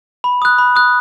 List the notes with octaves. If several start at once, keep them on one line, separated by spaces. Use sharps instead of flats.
B5
D#6 F#6
B5
D#6 F#6